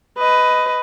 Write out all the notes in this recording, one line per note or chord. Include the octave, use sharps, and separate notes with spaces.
B4 D#5